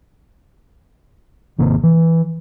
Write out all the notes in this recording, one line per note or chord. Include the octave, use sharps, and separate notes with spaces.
G#1 C3 D#3 A#3
E3